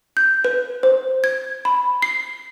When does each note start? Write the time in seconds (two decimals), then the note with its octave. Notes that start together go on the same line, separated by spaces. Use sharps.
0.17 G6
0.45 B4
0.83 C5
1.24 G#6
1.65 B5
2.02 C7